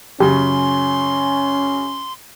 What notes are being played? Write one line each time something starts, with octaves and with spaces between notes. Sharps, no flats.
F#2 C#3 C#4 G4 C6